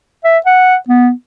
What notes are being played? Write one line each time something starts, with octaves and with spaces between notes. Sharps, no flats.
E5
F#5
B3